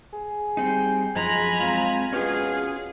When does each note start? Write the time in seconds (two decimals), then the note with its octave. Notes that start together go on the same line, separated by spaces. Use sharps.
0.13 G#4
0.57 G3 C4 D#4 G5
1.15 F#2 F3 G#3 G#5 A#5 B5
1.60 G#3 C4 F4
2.13 B2 C#4 F4 G#4 F5